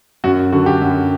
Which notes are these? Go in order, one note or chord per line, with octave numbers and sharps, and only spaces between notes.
F#2 F#4
D3 F#4
G4
F#2